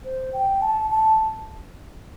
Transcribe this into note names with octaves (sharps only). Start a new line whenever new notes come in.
C5
G5
A5
A5